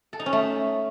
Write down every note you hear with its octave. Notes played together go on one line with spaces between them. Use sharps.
A4
D#4
C#4
A3